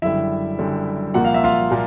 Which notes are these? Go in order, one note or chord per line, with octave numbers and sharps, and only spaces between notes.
F#1 F#2 D3 G3 E4 E5
F#1 F#2 D3 G3
C2 A#2 F3 A#3 F#5
F5
E5
F4 F5
A#2 F3 A#3